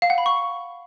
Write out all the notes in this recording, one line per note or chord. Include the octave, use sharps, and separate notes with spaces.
F5
F#5
B5
C#6